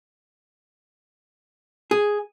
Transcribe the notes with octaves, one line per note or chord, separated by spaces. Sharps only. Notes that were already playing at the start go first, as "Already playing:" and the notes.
G#4